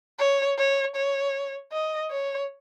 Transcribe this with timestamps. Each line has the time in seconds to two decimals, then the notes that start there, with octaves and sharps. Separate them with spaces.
0.19 C#5
0.58 C#5
0.96 C#5
1.72 D#5
2.11 C#5